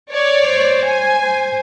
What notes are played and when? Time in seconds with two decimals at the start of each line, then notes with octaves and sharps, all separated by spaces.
0.11 C#5 D5
0.45 C5
0.85 G#5
1.23 C5